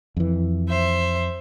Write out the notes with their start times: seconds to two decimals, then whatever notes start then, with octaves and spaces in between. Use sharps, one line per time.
0.17 F2 E3
0.68 C5 E5